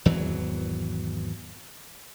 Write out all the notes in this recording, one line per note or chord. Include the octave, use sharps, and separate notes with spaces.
G#1 E2 E3 F#3